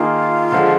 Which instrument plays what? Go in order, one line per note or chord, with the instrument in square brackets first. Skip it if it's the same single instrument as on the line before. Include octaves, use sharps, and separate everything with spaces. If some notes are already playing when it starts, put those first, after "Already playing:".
Already playing: [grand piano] D#3 A#3 D#4 G#4 [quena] F4
[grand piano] D3 F3 G#3